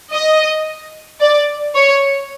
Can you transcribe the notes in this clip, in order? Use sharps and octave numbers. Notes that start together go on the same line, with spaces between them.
D#5
D5
C#5